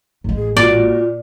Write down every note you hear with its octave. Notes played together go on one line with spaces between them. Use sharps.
A1 G#3
G#4
A#2 F#4 D5